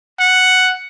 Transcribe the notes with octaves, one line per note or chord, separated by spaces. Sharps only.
F#5